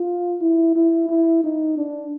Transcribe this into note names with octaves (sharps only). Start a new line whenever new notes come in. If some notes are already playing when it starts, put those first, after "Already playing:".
Already playing: F4
E4
E4
E4
D#4
D4